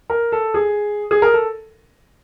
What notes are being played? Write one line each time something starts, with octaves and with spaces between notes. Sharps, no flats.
A#4
A4
G#4
G#4
A#4
A4